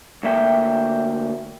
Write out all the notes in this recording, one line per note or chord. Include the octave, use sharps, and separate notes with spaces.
D2 A#3 E5 G5